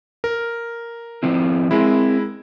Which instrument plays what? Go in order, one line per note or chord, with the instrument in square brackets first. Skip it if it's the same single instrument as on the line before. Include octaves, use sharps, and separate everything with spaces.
[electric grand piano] A#4
[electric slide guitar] F3 C4 E4
[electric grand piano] G#3 E4 [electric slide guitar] C4 A#4